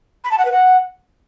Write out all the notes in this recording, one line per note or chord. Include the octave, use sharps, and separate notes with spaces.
B5
A5
F#5
B4
F#5